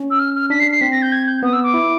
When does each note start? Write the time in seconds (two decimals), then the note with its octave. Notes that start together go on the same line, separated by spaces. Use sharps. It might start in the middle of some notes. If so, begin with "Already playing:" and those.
Already playing: C#4
0.11 E6
0.19 F6
0.35 F6
0.50 D4 B6
0.60 C7
0.71 C7
0.81 C4 B6
0.92 A#6
1.02 G6
1.12 G#6
1.27 G6
1.43 B3 D#6
1.53 E6
1.63 D6
1.74 E4